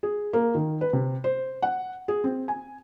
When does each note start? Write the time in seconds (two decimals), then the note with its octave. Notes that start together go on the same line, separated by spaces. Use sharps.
0.03 G#4
0.33 A#3
0.54 D#3
0.81 B4
0.93 C3
1.24 C5
1.62 F#5
2.08 G#4
2.24 C4
2.48 G#5